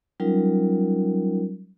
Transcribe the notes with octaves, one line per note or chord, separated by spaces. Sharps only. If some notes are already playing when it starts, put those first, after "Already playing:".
F#3 G3 C#4 D#4 F4 A#4